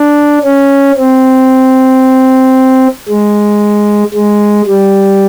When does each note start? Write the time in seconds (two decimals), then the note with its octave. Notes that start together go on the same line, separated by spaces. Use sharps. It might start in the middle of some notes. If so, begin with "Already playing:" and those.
Already playing: D4
0.44 C#4
0.97 C4
3.08 G#3
4.14 G#3
4.66 G3